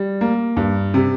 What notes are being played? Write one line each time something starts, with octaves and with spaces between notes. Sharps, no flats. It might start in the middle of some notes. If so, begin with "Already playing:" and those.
Already playing: G3
A#3
G2
C3